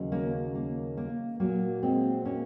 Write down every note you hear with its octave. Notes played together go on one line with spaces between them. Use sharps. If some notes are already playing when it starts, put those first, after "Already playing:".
Already playing: D#2 C#3 F#3
A#3 C#4
A#3
A#3
A#2 F#3 A#3
G#3 C4
A#3 C#4